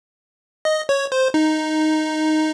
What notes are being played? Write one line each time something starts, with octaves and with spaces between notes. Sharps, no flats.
D#5
C#5
C5
D#4